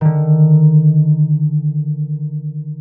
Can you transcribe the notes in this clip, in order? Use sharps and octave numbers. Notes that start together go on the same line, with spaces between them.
D3 D#3